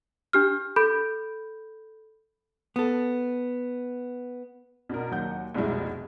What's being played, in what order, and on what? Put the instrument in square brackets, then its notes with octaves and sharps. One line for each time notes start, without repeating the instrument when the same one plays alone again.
[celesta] D4 G4 F6
A4 B5 G6
[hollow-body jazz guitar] B3 A4
[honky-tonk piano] B2 D4 A#4
D#2 F#3 F#5 G6
F1 C2 B2 G3 G#3 E4